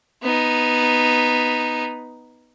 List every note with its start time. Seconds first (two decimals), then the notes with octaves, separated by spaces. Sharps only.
0.23 B3 D#4